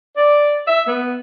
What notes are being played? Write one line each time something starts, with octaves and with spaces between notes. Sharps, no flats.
D5
E5
B3